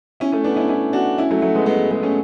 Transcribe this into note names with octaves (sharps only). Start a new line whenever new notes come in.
C#4 E4
A3 C#4
B3 D4
C#4 E4
C#4 E4
D4 F#4
C#4 E4
F#3 A3
F#3 A3
G#3 B3
G#3 B3
G#3 B3
A3 C#4